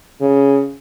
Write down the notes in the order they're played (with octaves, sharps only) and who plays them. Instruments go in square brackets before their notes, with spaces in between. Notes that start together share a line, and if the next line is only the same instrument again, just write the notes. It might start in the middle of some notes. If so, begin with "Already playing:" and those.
[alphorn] C#3